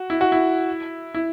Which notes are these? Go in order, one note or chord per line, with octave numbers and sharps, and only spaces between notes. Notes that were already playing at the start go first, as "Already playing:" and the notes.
Already playing: F#4
E4
F#4
E4
E4